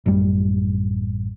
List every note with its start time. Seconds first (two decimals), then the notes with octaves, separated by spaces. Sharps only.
0.06 A1 F#2 G3